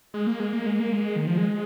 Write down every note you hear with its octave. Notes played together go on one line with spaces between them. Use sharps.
G#3
A#3
G#3
A#3
G#3
A#3
G#3
D#3
F3
G#3